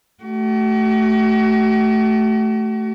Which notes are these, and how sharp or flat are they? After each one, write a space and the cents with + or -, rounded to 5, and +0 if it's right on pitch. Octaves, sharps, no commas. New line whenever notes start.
A3 +0 F#4 +45